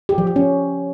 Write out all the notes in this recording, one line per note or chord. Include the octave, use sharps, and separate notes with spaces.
G4
F3
G4
C#4